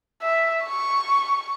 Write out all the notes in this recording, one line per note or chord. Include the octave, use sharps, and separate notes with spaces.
E5
C#6